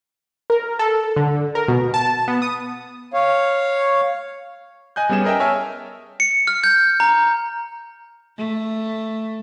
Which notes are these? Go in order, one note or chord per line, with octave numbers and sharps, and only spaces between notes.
A#4
A4
D3
A#4
B2
A5
B3
D#6
C#5 F5
D#5 G#5 F#6 G6
G3 B3 C#4 G#4 E7
G#4 A#4 D#5 E5 G5
C#5 E5 G#5 A5 E6 F6
C#7
F6
G6
A#5
A3